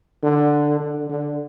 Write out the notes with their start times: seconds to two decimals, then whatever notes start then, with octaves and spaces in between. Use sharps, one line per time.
0.23 D3
0.80 D3
1.10 D3